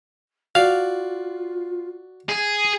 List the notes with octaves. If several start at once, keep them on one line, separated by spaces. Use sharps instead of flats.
F4 F#4 D5 F5
G#4